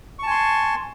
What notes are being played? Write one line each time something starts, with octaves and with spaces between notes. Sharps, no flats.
G#5 A5 C6 C#6